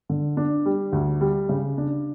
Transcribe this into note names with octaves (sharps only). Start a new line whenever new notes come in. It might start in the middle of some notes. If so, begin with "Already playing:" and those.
D3
D4
G3
D2
G3
C#3
D4